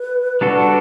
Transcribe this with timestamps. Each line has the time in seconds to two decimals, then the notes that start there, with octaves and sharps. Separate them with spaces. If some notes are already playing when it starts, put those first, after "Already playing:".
Already playing: B4
0.41 G3 D4 F#4 A4